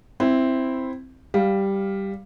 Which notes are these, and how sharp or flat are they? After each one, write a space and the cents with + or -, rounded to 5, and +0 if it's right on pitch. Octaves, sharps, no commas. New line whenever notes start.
C4 +0 E4 +0
G3 +0 F5 +0